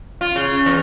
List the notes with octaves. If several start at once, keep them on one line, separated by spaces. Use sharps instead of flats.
F4
C#3
E2